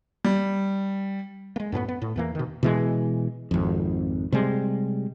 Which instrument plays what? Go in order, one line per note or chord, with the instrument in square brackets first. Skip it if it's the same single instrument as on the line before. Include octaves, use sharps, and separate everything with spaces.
[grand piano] G3
[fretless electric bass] G#3 A#3
F#2 A2 A#3 B3
B3
A2
E2 E3 A#3
B2 D#3
B2 E3 G#3
G#1 F2
C3 G3 G#3